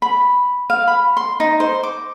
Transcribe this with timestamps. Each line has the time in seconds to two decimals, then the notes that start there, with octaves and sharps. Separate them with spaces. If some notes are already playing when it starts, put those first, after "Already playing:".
0.02 B5
0.70 F5
0.87 B5
1.17 C6
1.40 D#4
1.60 C5
1.83 D6